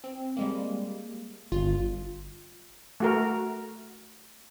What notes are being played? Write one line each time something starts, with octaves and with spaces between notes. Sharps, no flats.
C4
G3 G#3 A#3
G1 F4
A3 F#4 A#4